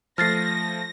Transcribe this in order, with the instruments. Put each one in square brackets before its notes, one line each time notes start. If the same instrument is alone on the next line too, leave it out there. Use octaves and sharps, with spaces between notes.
[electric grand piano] F3 A3 [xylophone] F6 A6 C7 [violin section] A#6